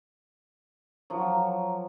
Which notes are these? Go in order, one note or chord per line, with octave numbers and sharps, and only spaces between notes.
F3 F#3